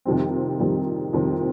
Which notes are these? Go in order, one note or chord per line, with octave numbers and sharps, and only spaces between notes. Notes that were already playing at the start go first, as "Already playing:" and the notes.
F2 C3 D#3 G3 C4
F2 C3 D#3 G3 C4
F2 C3 D#3 G3 C4